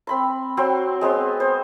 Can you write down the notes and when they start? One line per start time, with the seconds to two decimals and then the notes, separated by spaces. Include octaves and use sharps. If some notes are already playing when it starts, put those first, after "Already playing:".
0.07 C4 B5 C6
0.57 F#3 C4 G5 C6
1.01 G#3 B3 C4 C6
1.40 C5